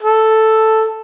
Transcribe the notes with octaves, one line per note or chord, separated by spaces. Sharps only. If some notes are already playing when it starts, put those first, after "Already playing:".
A4